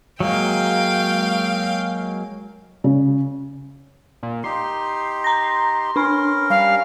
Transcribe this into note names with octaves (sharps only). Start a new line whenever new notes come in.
F#3 G#3 A#3 F5 G5
C#3
A#2
D#4 G4 C6
A#5 A#6
C#4 D4 A#4 B5
G3 F5